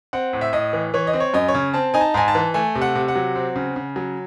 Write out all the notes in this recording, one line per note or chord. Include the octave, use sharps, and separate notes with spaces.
C4 F#5
A2
E5
A2 D#5
E3
E3 C#5
D#5
C4
C#5
F#2 D#5
C#5
C#3
C4 A5
D#4 G#5
A5
G#2 G#5
A5
E3
A3 G#5
C3
F#5
C3
F#5
F#3
C4
C#3
C#3
F#3